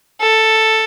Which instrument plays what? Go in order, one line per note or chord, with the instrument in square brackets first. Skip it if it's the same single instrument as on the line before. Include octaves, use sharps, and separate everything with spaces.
[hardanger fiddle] A4